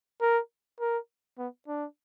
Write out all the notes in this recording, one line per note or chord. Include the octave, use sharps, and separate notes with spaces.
A#4
A#4
B3
D4